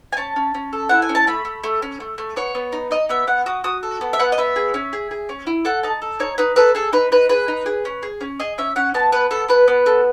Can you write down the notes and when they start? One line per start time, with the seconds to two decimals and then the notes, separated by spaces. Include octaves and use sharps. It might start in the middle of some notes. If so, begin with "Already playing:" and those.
0.13 G#5
0.17 C#4 A5
0.36 C#4
0.54 C#4
0.73 A4
0.89 E4 F#5
1.02 G#5
1.09 C#4
1.15 A5
1.27 A3 B5
1.45 A3
1.64 A3
1.82 C#4
2.00 A3
2.18 A3
2.36 B3 C#5
2.55 B3
2.72 D#4
2.91 D#4 D#5
3.09 B3 E5
3.27 B3 F#5
3.46 F#4 D#6
3.64 F#4 D#6
3.83 A4
4.01 B3
4.13 E5
4.19 B3 F#5
4.32 D#5
4.38 B3 E5
4.56 G#4
4.74 C#4
4.93 G#4
5.11 G#4
5.29 C#4
5.47 E4
5.65 A4 F#5
5.83 D#4 A5
6.02 A4
6.20 D#4 C#5
6.38 D#4 B4
6.56 A4 B4
6.75 G#4 A4
6.93 D#4 B4
7.12 D#4 B4
7.29 G#4 B4
7.48 D#4
7.66 G#4
7.85 C#4
8.03 G#4
8.21 C#4
8.40 G#4 D#5
8.58 C#4 E5
8.76 C#4 F#5
8.94 B3 A5
9.12 B3 B4
9.31 B3 A4
9.48 B3 B4
9.68 B3
9.86 A4